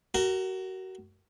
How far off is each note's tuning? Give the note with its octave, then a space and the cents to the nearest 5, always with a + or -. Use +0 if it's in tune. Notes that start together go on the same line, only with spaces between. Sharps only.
F#4 +30 A#4 -10